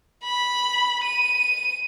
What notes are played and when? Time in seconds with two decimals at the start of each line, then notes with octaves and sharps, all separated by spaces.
0.24 B5
1.04 D#7